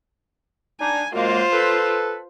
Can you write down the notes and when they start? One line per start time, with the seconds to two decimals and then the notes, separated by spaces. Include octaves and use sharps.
0.81 D4 D#4 G#5
1.14 F#2 G#3 A#3 F4 C5
1.53 A4 B4